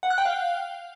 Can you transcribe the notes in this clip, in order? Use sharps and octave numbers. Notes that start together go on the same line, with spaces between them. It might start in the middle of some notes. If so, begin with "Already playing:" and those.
F#5
F#6
G5
F5